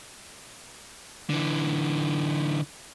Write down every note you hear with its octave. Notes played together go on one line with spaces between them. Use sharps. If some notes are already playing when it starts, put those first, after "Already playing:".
D3 E3